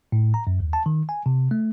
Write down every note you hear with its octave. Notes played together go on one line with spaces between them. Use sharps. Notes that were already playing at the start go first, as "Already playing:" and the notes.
A2
A#5
F#2
D#2
A5
D#3
G#5
C3
A3